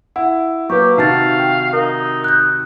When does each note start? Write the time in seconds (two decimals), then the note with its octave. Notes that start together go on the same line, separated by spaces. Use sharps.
0.16 E4 F#5
0.70 F#3 A#3 G4 B4 C#6
0.97 C3 D#3 D#4 F#4 F5 A5 A6
1.39 G5
1.73 D#4 A#4
2.24 F#6 G6